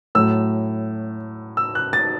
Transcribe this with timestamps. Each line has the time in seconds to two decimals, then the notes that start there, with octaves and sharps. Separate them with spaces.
0.15 A2 F#3 A3 E6
1.57 E6
1.75 F#6
1.93 A6